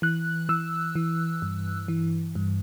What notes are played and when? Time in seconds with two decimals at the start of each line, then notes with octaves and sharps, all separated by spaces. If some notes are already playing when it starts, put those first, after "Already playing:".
0.02 E3 F#6
0.49 E3 E6
0.95 E3
1.42 G2
1.88 E3
2.35 G2